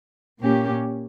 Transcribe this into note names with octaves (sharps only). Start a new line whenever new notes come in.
A#2 A#3 C#4 G4